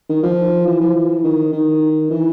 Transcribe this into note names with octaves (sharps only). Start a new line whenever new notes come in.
D#3
F3
E3
F3
E3
D#3
D#3
E3